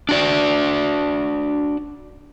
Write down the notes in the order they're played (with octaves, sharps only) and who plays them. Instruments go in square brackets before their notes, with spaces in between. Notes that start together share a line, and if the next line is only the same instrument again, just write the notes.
[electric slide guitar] D4 F#4 D5